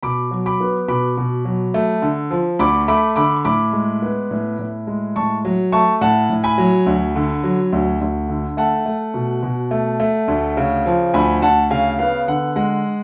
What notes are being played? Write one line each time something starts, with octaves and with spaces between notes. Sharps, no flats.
B2 B5 D6
F#3
B5 D6
B3
B2 B5 D6
B2
F#3
A3
D3
F3
D2 B5 D6
A3 B5 D6
D3 B5 D6
A2 B5 D6
G#3
B3
A2
A2
G#3
A2 A5 C#6
F#3
A3 A5 C#6
A2 F#5 A5
A2
G#5 B5
F#3
D2
D3
F#3
D2
D2
D3
A3 F#5 A5
A3
B2
B2
A3
A3
D2
C#3
F3
D2 G#5 B5
D2 F#5 A5
C#3 F5 G#5
B3 F5
D3 F#5
G#3 F#5